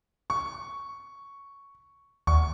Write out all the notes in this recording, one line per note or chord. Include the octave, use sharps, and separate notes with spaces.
C#6
D#2 C#6